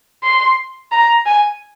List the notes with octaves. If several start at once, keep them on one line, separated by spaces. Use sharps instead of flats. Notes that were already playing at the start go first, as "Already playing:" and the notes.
C6
A#5
G#5